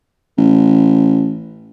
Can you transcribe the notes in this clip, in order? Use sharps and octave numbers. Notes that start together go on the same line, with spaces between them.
A1